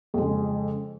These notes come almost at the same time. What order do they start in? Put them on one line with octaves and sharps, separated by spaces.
F2 G#3 C#3